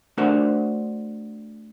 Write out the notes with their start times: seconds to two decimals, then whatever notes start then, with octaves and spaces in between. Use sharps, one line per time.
0.18 A3 D4 F#4 A#4 C5 F#5